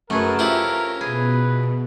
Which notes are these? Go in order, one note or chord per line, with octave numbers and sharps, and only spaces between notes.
F#2 A3 G#4 A#4 B4 A5
C#4 E4 F4 G4 A4 C5 A#5
B2 G#4 B4